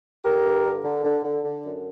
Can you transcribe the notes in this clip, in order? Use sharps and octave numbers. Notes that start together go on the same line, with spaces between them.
D3 G4 A#4
G2
D3
D3
D3
D3
D3
F#2